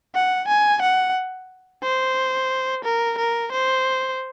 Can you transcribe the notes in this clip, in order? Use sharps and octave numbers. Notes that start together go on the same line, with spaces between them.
F#5
G#5
F#5
C5
A#4
A#4
C5